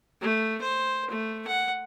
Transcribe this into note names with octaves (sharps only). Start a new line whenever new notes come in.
A3
C5
A3
F#5